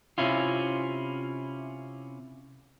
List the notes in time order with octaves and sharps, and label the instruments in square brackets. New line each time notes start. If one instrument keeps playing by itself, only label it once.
[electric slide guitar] C3 C#4 E4 F4